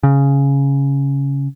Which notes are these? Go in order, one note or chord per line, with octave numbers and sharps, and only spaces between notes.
C#3